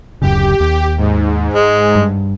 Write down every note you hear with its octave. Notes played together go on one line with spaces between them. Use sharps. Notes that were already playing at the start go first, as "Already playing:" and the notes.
D1 F#2 C#3 G4
D#2 G4
G#2
G#3
G2